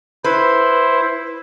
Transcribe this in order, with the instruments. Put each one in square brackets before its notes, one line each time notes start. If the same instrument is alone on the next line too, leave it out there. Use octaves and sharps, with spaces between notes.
[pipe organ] E4 C5 [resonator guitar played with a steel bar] B4